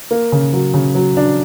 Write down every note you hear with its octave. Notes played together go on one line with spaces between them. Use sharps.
A#3
C#3
F#3
C#3
F#3
D4